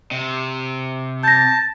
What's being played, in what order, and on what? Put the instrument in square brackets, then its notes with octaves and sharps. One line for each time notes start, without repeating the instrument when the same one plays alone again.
[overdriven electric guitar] C3
[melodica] A5 [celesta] G6 A#6